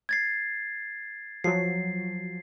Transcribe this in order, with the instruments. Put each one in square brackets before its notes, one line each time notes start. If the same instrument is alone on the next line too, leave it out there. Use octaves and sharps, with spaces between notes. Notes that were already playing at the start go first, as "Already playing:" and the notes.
[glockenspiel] G#6 A6 C7
[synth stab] F3 F#3 [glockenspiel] C7